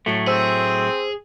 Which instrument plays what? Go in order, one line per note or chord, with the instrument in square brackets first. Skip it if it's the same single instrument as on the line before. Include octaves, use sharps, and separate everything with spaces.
[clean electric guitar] A2 F#3 A3
[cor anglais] C4 [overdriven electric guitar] G#4 [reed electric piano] C5 E6